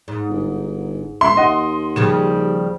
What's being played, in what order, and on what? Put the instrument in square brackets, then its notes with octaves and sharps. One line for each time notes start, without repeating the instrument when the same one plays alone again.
[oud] G#2
[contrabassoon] G1
[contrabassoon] C#2 [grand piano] E5 [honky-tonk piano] C6
[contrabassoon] D#2 [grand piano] D#5 F#5
[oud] C#3 F3 G3 [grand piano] E7